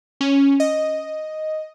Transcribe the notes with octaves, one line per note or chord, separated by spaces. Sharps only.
C#4
D#5